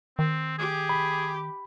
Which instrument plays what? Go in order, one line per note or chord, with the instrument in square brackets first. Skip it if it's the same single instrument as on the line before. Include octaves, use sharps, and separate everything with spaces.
[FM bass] D#3 [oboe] C4
[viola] G4 [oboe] G#4
[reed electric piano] B5